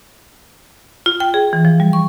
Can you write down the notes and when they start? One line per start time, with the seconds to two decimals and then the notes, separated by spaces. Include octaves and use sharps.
1.06 F4
1.20 G5
1.34 G#4
1.53 E3
1.65 F3
1.80 G3
1.93 C#6